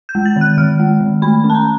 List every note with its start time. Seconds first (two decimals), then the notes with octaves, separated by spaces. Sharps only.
0.09 G6
0.15 G#3
0.25 A6
0.36 D#3
0.41 F#6
0.57 D#3 F6
0.79 G#3
1.00 D#3
1.22 A3 B5
1.44 C#4
1.50 A5
1.55 A#5